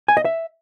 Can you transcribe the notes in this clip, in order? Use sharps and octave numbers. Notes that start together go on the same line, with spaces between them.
G#5
D#5
E5